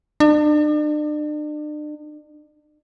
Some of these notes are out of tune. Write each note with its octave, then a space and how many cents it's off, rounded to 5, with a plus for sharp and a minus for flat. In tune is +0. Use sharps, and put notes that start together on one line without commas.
D4 +40